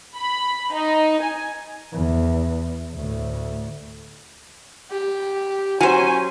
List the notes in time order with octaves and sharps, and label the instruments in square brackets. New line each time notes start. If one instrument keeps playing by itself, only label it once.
[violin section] B5
D#4
G#5
[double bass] E2
D2 A2
[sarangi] G4
[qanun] F#3 C5 [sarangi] C#4 [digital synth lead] G#5